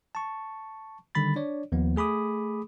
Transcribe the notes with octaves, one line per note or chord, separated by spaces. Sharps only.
A5 C#6
D3 D#3 G3 B5 A6
D4 C#5 D5
D#2 F3 B3
A3 G#4 B5 D6 D#6